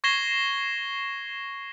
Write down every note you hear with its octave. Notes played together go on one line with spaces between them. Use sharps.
C#6 G#6 A#6 C7 E7 G7